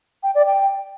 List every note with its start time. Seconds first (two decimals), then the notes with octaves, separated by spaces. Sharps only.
0.23 G5
0.35 D5
0.47 G5